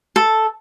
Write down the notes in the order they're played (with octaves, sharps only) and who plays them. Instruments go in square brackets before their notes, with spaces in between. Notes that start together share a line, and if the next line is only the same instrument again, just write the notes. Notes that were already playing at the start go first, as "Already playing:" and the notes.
[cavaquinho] A4